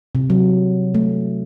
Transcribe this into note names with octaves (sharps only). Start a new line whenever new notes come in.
C3
F#3
A3